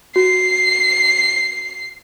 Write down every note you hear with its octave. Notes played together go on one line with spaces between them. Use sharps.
F#4 C7